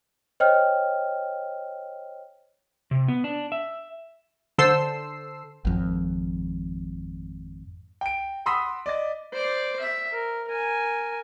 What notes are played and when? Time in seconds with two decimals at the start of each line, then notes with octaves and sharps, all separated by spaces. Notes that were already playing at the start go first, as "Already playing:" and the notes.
0.40 C5 C#5 D#5 G5 F6
2.91 C3
3.08 B3
3.24 D4
3.52 E5
4.58 D3 A4 C5 E6 C7
5.65 G#1 F2
8.01 G5 D7
8.46 F#5 B5 C6 D#6 E6 B6
8.86 D5 D#5 A6
9.34 C5 D5
9.80 E5
10.13 A#4
10.48 A#4 G#5